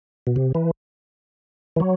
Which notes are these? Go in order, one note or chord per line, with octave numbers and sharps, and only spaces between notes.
B2
C3
E3
E3
F#3